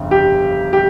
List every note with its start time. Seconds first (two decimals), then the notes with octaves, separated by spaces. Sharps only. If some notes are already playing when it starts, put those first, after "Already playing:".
Already playing: G1 F2 C#3
0.11 G4
0.73 G4